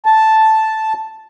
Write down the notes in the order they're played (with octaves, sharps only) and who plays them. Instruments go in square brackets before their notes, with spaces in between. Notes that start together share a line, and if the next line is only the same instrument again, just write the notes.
[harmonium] A5